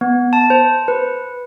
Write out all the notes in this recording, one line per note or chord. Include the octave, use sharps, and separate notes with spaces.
B3
A5
C5
B4